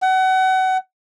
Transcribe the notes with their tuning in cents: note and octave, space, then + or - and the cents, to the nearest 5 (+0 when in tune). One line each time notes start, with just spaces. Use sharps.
F#5 +30